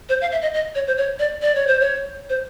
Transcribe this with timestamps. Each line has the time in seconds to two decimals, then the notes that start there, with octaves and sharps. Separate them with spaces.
0.09 C5
0.21 F5
0.32 E5
0.42 D#5
0.54 D#5
0.75 C#5
0.87 C5
0.98 C#5
1.19 D5
1.42 D5
1.55 C#5
1.67 C5
1.80 C#5
2.29 C5